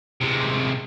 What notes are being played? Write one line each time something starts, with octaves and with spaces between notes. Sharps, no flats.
C3 G#3